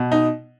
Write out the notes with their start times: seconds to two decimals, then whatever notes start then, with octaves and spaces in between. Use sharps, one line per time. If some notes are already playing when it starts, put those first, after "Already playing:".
Already playing: B2
0.12 D#4